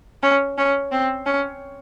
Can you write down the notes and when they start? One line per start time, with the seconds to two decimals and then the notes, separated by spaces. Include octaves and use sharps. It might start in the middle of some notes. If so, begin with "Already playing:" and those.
0.23 C#4
0.58 C#4
0.92 C4
1.26 C#4